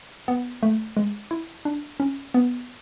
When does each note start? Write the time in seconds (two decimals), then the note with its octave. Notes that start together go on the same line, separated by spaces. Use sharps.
0.28 B3
0.63 A3
0.97 G#3
1.31 E4
1.65 D4
2.00 C#4
2.34 B3